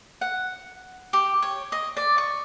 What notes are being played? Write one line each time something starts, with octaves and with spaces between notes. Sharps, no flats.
F#5
G4
C#5
D#5
D5
C#6